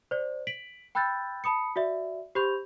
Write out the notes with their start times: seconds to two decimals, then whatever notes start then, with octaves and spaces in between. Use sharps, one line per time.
0.11 C5 D5
0.47 B6 D7 F#7
0.95 G5 B5 E6 F#6 G6 A6
1.44 A5 B5 D#6 C#7
1.76 F#4 D5 E5
2.35 G4 C5 B5 C#6 G6 F7